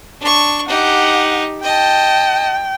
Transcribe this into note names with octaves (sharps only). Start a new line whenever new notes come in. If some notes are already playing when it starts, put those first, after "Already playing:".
D4 C#6
D#4 G4 F#5
D#5 G5 A5